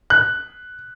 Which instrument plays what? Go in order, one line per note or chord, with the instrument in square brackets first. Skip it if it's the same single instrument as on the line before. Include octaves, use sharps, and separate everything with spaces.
[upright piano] F#6